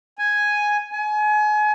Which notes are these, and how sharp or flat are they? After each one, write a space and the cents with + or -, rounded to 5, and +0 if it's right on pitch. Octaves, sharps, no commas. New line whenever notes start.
G#5 +0
G#5 +30